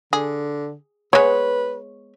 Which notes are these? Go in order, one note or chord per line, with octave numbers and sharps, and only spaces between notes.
D3 G#4
G#3 B3 B4 C#5